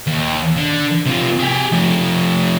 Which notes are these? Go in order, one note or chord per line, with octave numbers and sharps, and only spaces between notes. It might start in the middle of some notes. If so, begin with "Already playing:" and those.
D#2
D3
C3 F4
G4 G#4
F3 A3